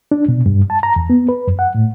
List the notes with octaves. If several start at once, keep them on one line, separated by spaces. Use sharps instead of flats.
D4
B2
G2
A5
A#5
E2
B3
B4
F#2
F#5
A2